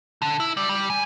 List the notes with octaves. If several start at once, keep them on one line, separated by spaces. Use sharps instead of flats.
D3
E4
G3
G3
G#5